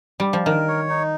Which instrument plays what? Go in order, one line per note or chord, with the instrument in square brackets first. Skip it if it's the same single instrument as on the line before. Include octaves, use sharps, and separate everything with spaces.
[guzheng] G3
F3
[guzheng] D#3 [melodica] A#4
[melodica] C#5
D#4